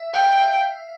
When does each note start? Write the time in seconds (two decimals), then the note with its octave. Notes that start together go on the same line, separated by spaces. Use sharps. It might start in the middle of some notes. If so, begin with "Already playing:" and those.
Already playing: E5
0.14 F5 G5